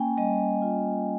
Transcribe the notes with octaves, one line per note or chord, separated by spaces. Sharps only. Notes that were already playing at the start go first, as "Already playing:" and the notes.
Already playing: A#3 C#4 G5 G#5
G3 D#5
F4